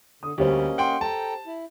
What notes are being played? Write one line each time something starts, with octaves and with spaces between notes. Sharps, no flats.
D3 D#6
D2 G3 A#3 C#4 G4 C5 D#5
F#5 G5 C6
A4 G5 A5 A#5
E4